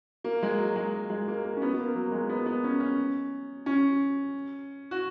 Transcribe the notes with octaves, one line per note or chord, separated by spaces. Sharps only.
A#3
G#3
F#3
G#3
A#3
G#3
A#3
A#3
C#4
B3
B3
A#3
F#3
A#3
G#3
B3
B3
C#4
C#4
C#4
F#4